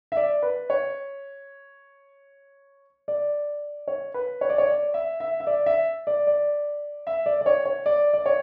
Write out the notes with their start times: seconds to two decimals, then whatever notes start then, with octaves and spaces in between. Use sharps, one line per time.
0.12 E5
0.17 D5
0.43 B4
0.70 C#5
3.08 D5
3.88 C#5
4.14 B4
4.41 C#5
4.50 D5
4.58 C#5
4.67 D5
4.94 E5
5.20 E5
5.40 E5
5.47 D5
5.66 E5
6.07 D5
6.27 D5
7.07 E5
7.26 D5
7.41 D5
7.46 C#5
7.65 C#5
7.86 D5
8.14 D5
8.26 C#5